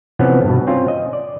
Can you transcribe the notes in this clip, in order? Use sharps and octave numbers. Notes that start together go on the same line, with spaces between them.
C3 E3 F3 B3 C#4
G2 B2
C4 C#4 F4
D#5
D5